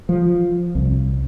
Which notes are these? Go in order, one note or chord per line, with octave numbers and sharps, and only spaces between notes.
F3
C2